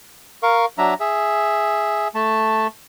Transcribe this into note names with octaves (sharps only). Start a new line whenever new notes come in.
A#4 F5 C#6
F#3 D4 E5 A#5
G#4 E5
A3 A5